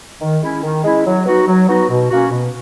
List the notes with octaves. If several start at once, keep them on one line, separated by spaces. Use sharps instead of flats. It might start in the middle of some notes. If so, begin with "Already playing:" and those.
D#3
G#3 C#4 E4
D#3
G#3 C#4 E4
F#3
B3 D#4 F#4
F#3
B3 D#4 F#4
B2
A#3 C#4 F#4
B2